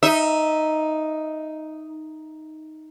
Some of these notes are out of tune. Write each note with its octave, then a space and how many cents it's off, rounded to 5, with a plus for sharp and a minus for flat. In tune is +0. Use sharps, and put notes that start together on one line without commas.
D#4 +0 E5 -15